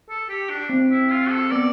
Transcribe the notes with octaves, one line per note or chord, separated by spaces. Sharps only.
A4
G4
D4
C4
E4
F4
A4
B3 D5